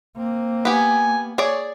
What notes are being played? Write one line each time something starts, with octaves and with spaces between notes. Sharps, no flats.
A#3 C4
B3 G4 G#5
G#4 C#5 D5